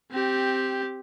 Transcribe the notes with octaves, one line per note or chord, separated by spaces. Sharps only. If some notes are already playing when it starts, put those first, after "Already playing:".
C4 G4